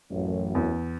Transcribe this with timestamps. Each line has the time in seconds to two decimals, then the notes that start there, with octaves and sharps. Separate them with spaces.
0.10 A1 F#2
0.55 E2